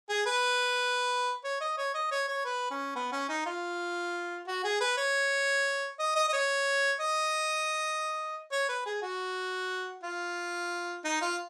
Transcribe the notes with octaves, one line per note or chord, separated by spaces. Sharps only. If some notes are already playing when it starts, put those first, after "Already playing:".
G#4
B4
C#5
D#5
C#5
D#5
C#5
C#5
B4
C#4
B3
C#4
D#4
F4
F#4
G#4
B4
C#5
D#5
D#5
D#5
C#5
D#5
C#5
B4
G#4
F#4
F4
D#4
F4